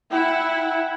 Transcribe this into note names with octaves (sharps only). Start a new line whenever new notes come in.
E4 E5 F#5 G5